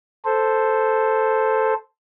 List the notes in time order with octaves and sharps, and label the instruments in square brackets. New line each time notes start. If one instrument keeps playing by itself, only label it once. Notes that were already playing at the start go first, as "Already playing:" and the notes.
[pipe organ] A4 C5